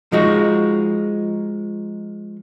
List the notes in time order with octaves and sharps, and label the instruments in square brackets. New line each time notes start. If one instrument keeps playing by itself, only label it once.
[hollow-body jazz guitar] F3 G#3 D#4 F#4